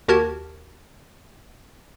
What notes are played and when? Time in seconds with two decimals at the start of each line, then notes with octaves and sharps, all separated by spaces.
0.08 D#2 F#4 G4 A#4 A5 G#6